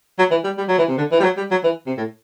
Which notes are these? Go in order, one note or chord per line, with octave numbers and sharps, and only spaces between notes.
F#3
E3
G3
G3
F#3
E3
C3
D3
E3
G3
F#3
G3
F#3
E3
C3
A2